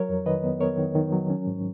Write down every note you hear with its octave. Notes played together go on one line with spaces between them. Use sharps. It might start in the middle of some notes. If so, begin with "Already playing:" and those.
Already playing: F#3 A#4 C#5
F2
D#3 B4 D#5
B3
B3 A#4 C#5
D#3
D#3
F#3
C#4
G#2